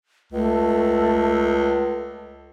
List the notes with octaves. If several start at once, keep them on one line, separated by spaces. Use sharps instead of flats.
C#2 A3